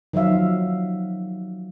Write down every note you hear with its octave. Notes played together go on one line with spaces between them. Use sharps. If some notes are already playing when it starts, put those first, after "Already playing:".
D#3 F3 F#3 E5 F5